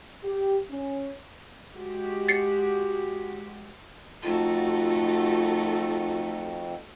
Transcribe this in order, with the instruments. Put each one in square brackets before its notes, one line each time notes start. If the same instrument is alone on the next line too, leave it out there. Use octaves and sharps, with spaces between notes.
[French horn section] G4
C#4
[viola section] G#3 F#4 G4
[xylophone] A6 C7 C#7
[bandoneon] F2 [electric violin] A3 D#4 [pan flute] F4 [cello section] F#4 A4